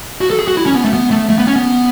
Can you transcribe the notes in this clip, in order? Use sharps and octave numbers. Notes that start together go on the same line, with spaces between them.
F#4
A4
G#4
F#4
E4
C#4
B3
A3
B3
A3
A3
B3
C#4
B3